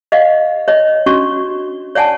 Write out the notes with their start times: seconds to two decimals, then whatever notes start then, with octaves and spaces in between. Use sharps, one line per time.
0.12 D#5 F5 F#5
0.68 C#5 D#5
1.06 C#4 D4 F#4 C#6
1.95 C#5 D5 F#5 G#5 A5